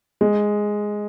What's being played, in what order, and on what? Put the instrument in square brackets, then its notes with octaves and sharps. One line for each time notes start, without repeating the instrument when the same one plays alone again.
[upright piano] G#3